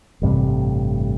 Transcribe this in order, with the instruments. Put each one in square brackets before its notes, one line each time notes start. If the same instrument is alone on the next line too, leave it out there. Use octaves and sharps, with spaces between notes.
[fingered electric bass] A1 G2 C3